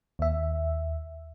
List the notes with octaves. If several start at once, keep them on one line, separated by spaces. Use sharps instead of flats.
D#2 E5